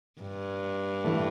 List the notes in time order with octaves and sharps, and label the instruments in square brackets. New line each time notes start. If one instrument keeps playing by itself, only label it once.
[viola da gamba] G2
[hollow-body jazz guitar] E3 A3